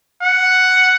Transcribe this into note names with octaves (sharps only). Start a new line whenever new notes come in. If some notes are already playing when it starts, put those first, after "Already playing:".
F#5